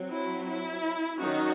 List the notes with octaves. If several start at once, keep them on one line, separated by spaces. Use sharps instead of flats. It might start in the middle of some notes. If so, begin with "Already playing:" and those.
Already playing: F#3 C4
E4
E4
D#3 F#3 C#4 D#4 F#4